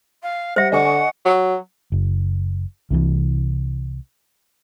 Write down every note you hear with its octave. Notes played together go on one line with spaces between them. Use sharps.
F5
G3 C5 E5 F#5
D3 D#5 F#5 G#5 C#6
F#3
F#1
C2 C3 D#3 E3